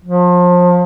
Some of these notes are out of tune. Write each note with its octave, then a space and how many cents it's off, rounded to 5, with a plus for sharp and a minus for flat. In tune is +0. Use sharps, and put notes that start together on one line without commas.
F3 +30